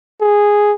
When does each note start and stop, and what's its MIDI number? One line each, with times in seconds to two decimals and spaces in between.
0.21 0.73 68